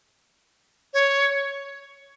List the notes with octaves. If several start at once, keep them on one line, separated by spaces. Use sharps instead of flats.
C#5